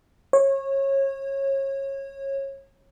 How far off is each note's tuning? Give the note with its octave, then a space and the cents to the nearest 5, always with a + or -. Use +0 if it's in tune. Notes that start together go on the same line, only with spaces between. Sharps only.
C#5 -25